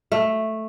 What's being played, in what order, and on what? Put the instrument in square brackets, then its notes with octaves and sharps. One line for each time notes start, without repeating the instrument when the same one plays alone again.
[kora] A3